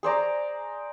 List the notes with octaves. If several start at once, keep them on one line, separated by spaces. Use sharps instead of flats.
G#4 C5 D5 A#5